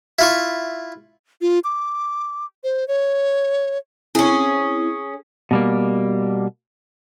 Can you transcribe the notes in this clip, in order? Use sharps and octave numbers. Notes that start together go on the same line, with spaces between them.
E4 F4 C#6
F4
D6
C5
C#5
C4 C#4 E4 G#4
B2 G3 A#3